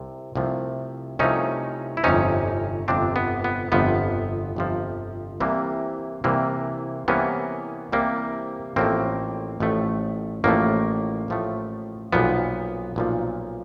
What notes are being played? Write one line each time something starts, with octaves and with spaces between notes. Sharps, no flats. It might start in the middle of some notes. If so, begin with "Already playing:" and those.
Already playing: C2 C3
C2 C3 F3 A3
C2 C3 F3 A3 C#4 D#4
E4
G1 F2 C3 F3 C#4 D#4
G1 F2 C3 F3 C4 D4
B3
B3
G1 F2 C3 F3 B3
G1 F2 C3 F3
C2 C3 E3 G3 A#3
C2 C3 E3 G3 A#3
C2 C3 E3 G3 A#3 B3 C#4
C2 C3 E3 G3 A#3
A1 A2 F3 A3 A#3 C4
A1 A2 F3 A3
A1 A2 F3 A3 A#3
A1 A2 F3 A3
B1 A#2 F3 B3
B1 A#2 F3